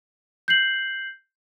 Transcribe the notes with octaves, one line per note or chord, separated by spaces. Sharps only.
G6 C7 F#7